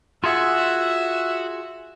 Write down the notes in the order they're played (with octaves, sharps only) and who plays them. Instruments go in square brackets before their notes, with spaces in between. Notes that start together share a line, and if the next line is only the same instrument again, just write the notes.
[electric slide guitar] F4 G#4 F#5 [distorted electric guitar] F#4 [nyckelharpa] E5